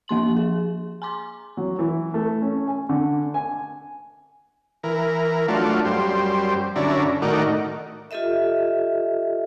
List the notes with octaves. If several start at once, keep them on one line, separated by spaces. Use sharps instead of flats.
F3 A#3 C6 F#7
G#4
G#5 A#5 C6 D6
F#3
E3
A3
C#4
G#5
D3
G#5
E3 A#4
F#3 A3 D4 F4
F#2 G3 C5
F#2 D3 C#4 D4 E4 A#5
A2 D#3 D#4 F#4 A#4 D5
F4 G4 A4 D#5 E5